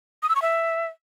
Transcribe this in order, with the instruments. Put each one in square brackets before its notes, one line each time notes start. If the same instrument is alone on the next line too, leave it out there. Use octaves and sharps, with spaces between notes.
[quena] D#6
E6
C#6
E5